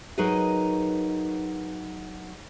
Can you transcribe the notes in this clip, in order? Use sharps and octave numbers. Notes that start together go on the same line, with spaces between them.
F#3 D#4 G#4 A#4 B4 D#5